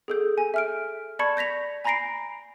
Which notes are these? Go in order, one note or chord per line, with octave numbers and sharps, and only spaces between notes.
G#4 A4 G6
G#5
E5 F6 D7
D5 A5 B5 C#6 G#6 C#7
G6 A#6 B6 F7
G#5 A#5 B5 A#6 C7 D7